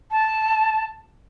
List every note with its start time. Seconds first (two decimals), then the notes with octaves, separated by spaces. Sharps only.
0.11 A5